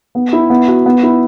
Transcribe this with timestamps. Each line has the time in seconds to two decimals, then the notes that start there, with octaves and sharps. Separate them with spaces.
0.15 B3
0.33 E4
0.50 B3
0.68 F#4
0.86 B3
1.03 E4